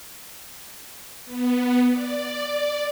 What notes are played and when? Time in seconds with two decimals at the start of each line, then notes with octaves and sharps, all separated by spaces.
1.26 B3
1.90 D5